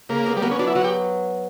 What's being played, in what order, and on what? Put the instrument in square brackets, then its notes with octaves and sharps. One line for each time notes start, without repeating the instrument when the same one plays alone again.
[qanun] C#3 [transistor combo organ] A#3
[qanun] B3
[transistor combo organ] G3
[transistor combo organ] A#3 [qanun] B3
[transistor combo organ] C#4
[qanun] F#3 [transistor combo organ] D4
[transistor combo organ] E4
[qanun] F#3 [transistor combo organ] F#4
[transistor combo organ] G4